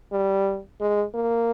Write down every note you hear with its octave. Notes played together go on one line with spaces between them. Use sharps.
G3
G#3
A#3